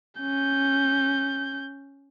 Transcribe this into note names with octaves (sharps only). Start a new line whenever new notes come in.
C#4 G6